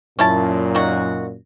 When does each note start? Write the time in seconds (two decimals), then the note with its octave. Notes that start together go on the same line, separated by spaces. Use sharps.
0.19 F#2 A#2 C#4 E4 A5
0.75 D#3 F#4